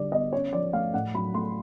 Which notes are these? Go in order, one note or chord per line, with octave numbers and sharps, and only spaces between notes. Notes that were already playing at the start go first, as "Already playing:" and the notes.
Already playing: D3 G3 D5
B3 D#5
C#4 C#5
F3 D5
A3 F5
A2 F#5
F#3 B5
A3 C6